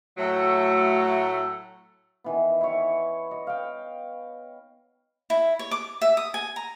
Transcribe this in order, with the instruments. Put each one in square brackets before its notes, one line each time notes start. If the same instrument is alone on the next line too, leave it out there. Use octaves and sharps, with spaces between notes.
[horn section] A2 F#3 A3
[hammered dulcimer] D#3 E3 B3
E4 C#5
D#5
F5 G5
[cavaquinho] E4
C#5
D6
E5
D#6
G#5
A#5